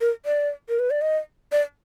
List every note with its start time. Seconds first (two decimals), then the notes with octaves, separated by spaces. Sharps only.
0.01 A#4
0.26 D5
0.69 A#4
0.79 B4
0.90 D5
1.01 D#5
1.52 D5